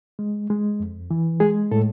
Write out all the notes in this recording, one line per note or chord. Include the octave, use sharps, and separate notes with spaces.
G#3
G#3
F2
E3
G#3 G#4
A2 A4